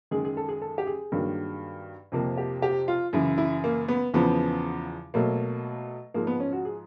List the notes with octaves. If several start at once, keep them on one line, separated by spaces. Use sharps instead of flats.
F#2 D#3 G#3 G#4
G#4
A4
G#4
A4
G4
G#4
G2 D#3 F#3 A#3
F2 C3 F3 A#3
G4
G4
F4
F#2 C#3 E3 E4
E4
A#3
B3
E2 C#3 F3 B3
B2 F#3 A3 A#3
G#2 F3 G#3 A#3
B3
C#4
F#4
G#4